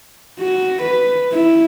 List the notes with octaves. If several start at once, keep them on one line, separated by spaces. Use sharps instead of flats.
F#4
B4
E4